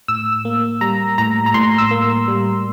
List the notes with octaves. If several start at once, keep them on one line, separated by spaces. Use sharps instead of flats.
A2 E6
A#3
G3 A#5
A2 A#5
A#5
A2 C6
E6
A#3
G3